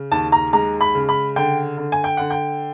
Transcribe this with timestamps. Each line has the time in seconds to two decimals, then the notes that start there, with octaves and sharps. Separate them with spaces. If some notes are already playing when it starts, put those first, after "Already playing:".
Already playing: C#3
0.11 D#2 A5
0.32 A#5
0.53 G#3 A#5
0.81 B5
0.95 C#3
1.09 B5
1.36 D3 G5
1.78 D3
1.92 G#5
2.04 G5
2.17 D3 F#5
2.30 G5